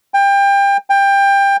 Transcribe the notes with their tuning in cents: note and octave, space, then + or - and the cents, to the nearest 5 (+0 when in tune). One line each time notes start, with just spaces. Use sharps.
G5 +25
G5 +20